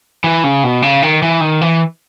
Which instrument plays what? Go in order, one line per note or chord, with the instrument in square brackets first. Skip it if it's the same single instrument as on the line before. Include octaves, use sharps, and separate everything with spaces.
[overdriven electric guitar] E3
C#3
B2
C#3
D#3
E3
D#3
E3